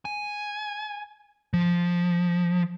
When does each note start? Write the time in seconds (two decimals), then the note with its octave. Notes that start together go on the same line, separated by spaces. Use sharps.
0.05 G#5
1.53 F3